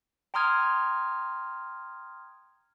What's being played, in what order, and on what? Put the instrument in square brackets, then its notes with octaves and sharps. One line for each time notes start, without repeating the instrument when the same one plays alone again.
[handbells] G5 A#5 C6 D#6 F6 G#6